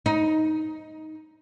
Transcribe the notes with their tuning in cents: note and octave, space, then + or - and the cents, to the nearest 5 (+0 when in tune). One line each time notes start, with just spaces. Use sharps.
D#4 +10